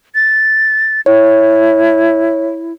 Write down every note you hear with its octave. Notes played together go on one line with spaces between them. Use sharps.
A6
E4 C#5